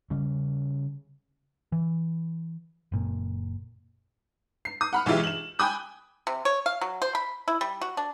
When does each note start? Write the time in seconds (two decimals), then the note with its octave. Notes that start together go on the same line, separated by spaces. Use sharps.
0.10 C#3 G3 C#4
1.72 E3
2.92 F#1 A#2
4.65 C7
4.81 D#6
4.93 F#5 B5 F6
5.06 B1 E3 G#3 F4 G4 E5
5.24 E7 F#7
5.59 G5 G#5 B5 D#6 F#6
6.27 C3
6.45 C#5
6.66 F5
6.81 F#3
7.02 C5
7.15 B5
7.48 E4
7.61 G3
7.81 F#4
7.97 D4